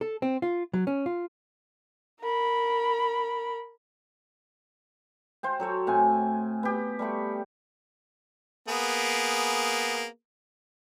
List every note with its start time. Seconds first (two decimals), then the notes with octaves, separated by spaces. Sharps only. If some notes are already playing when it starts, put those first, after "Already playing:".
0.01 A4
0.22 C4
0.42 F4
0.74 F#3
0.87 C#4
1.06 F4
2.21 A#4 B5
5.43 C5 F5 G5
5.60 F#3 A4 C#5 G5
5.87 A2 C4 G#5
6.63 B3 G4
6.99 G3 A3 B5 C#6
8.69 A#3 B3 G#4